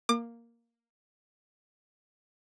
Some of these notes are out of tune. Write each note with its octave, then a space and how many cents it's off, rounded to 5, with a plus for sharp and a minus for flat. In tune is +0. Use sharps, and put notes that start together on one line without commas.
A#3 +0 D6 +35